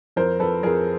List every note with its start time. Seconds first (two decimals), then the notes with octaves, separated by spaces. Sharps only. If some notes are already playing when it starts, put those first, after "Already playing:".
0.16 F2 A#4 C5
0.40 F2 A4 B4
0.63 F2 G#4 A#4